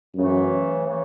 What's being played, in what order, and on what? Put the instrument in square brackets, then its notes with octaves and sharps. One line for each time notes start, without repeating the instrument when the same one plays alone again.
[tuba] F#2 [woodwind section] C#3 E3 A3
[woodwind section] C#3 E3 A3